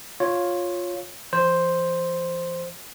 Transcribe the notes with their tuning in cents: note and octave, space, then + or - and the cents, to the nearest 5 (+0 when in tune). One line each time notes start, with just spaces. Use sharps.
F4 +10 C#5 -5 F5 +5
F3 -45 C5 +0